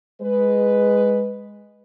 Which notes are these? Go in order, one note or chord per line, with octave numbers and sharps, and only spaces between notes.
G#3 B4